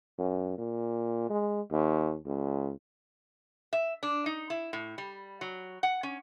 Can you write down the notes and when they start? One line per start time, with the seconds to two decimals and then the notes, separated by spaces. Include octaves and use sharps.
0.19 F#2
0.58 A#2
1.30 G#3
1.71 D#2
2.25 C#2
3.73 E5
4.03 D4
4.26 D#4
4.50 E4
4.73 A2
4.98 G3
5.41 F#3
5.83 F#5
6.03 C#4